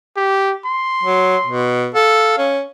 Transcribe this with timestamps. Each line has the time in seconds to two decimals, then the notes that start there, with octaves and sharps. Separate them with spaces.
0.16 G4
0.65 C6
1.03 F#3
1.46 B2
1.95 A4 F5
2.38 C#4